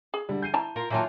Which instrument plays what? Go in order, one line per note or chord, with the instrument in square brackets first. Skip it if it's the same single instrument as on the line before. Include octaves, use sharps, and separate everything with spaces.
[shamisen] G#4
[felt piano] D3 G3
G6 C7 D#7
[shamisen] E4 A5 A#5
[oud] F4 [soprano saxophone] A#4
[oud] D#3 F#3 F4 [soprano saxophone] A#3 [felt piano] E5 G#5 A5